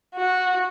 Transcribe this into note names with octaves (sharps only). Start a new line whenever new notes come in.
F#4